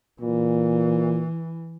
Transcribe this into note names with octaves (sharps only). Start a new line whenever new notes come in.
A#2 E3